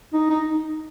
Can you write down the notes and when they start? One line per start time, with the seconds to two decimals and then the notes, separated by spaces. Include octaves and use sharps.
0.13 D#4
0.30 D#4